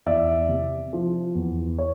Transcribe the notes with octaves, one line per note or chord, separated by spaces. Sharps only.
E2 D5 E5
C3
F3
E2
C#5